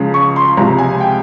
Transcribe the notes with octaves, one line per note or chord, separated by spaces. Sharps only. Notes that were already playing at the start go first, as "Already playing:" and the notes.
Already playing: C#2 C#3 F3
C#6
C6
C#2 C3 F3 A#5
G#5
G5